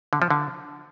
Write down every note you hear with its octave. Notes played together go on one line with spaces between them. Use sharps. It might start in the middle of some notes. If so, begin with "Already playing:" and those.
D3
F3
D3